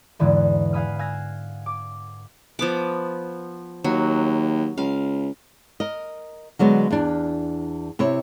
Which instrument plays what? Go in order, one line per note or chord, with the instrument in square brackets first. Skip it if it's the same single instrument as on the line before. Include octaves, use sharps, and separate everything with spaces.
[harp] E2 G#2 D3 E3
F5 F#5 G#5 B5 D#6 F6
F5 G#5 E6 F#6 A#6
D6
[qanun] F3 B3 D6
[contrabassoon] D#2 [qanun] F#3
[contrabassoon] C#2 [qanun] F5
[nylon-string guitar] A#4 D#5
D3 F#3 G#3 B3
E2 D4
C3 E4 C#5